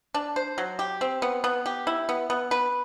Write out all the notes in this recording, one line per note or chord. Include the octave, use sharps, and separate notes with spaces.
D4
C5
F#3
G4
C4
B3
B3
G4
E4
B3
B3
B4